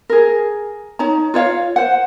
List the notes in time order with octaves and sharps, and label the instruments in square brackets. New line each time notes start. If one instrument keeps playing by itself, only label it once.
[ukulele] G#4 A#4
D#4 C#5 A#5
F4 C#5 D5 F5
C5 F#5